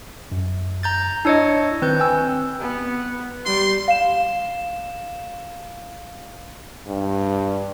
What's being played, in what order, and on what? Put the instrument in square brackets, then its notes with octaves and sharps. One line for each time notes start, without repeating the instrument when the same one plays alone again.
[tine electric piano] F#2
[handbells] A#5 G6 A6
[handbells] D4 C#5 D#5 [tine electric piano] E4 E6 C#7
[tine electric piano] D#3 [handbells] C4 B4 G6
[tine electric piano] G5 G#5 E6
[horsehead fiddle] B3
[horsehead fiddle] G3 [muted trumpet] C6
[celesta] F5 E7
[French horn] G2